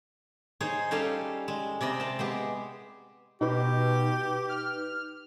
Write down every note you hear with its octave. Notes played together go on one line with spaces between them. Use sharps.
D#4 G#4 C5 C#5
G3 C#4 A4 C#5 F5
G#3
C3 D5 D#5 B5
C4 A5
G#3 B3 G4
B2 D#4 G4 B4
F6